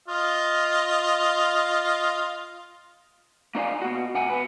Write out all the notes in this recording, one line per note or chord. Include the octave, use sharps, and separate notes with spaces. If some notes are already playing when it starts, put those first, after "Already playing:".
F4 D#5 F5
A#3 D#4 D5 F5 G#5
B2 F#4
C3 F#5 G#5
B3